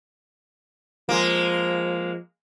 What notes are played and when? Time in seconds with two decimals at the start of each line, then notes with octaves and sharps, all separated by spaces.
1.09 F3 G#3 A#3